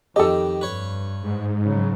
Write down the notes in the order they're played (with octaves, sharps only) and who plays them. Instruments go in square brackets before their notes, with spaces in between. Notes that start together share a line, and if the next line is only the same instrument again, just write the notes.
[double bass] F2 [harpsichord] D#3 G4 [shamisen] A4 D#5
[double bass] G2 [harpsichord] B4 C#5
[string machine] G#2
[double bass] C#3 F#3